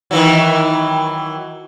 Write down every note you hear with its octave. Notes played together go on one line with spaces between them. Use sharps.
D#3 E3 F#3